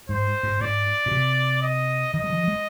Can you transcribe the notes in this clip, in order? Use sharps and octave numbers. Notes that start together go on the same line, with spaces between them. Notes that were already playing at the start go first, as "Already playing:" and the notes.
G#2 C5
G#2
G#2 D5
A#2
C3
D#5
D#3 D#5
G3
F3
G#3